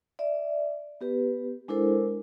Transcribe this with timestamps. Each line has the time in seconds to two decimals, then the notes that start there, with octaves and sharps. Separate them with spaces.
0.19 D5 E5
1.01 B3 G4 B4
1.68 G#3 D4 E4 A4 A#4 C5